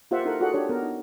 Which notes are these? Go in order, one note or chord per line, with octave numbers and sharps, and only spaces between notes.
A#3 F4 G4 C5 E5 F#5
D#4 E4 A4 A#4 F#5
F4 F#4 G#4 A4 D5 F#5
D4 G4 C#5
B3 A#4
D#4